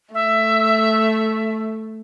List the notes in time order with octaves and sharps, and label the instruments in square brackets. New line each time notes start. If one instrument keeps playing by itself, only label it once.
[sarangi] A3 [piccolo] E5